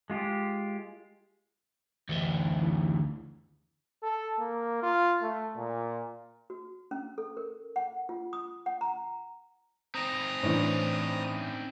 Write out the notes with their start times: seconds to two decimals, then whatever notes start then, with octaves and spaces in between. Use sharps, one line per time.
0.10 G#3 F4 G4
2.09 D2 E3
4.03 A4
4.39 A#3
4.83 F4
5.22 A3
5.57 A#2
6.50 F#4
6.91 C#4
7.18 A4
7.37 A#4
7.76 F#5
8.09 F4
8.33 D#6
8.66 F#5
8.81 A#5
9.95 C4 D#4 A#5 D#6
10.43 A2 E3 C#4 D4 C5